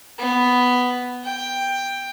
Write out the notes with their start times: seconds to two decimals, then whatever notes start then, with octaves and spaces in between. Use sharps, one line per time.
0.18 B3
1.24 G5